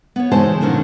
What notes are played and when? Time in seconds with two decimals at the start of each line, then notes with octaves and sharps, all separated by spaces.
0.16 B3 C#5
0.31 C#3 E3 G#3 D#4 C5 A5
0.60 F2 A#2 D3 D#3 C#4 D4